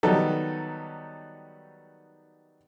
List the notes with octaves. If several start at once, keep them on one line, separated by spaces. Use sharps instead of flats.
D#3 F#3 G3 B3 D#4 A4